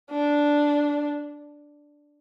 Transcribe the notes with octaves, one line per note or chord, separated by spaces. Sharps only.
D4